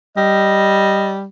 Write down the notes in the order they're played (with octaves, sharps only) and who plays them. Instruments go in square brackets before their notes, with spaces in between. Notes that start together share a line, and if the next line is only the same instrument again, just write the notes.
[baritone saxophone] G3 [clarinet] D#5